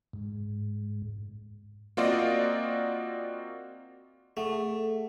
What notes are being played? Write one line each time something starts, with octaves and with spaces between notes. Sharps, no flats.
G#2
A#3 C4 F4 F#4 D5 D#5
A3 G#4 A4 F#5